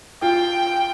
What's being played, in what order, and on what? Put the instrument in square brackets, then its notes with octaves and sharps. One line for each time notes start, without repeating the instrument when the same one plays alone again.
[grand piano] F4 [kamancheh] G5